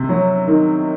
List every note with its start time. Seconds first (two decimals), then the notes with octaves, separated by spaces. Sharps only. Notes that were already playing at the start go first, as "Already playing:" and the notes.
Already playing: C3
0.09 F#3
0.48 D#3